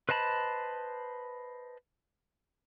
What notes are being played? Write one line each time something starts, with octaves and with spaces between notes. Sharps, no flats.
B4 C5 D#5 A5 B5